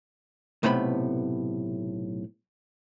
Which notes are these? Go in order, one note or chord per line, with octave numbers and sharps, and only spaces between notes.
B1 A2 C3 A3 B3 B5